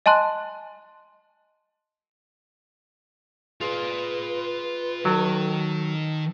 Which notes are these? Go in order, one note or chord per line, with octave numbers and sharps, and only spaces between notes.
D#5 G#5 A5 C6 F#6
G#3 F4 B4 D5
D#3 F#3 A4